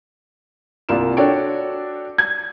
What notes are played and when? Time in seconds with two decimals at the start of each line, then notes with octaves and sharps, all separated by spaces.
0.89 C2 A#3 F4 D5 E7
1.17 D4 F#4 A4 C#5 D5 G5
2.18 G#6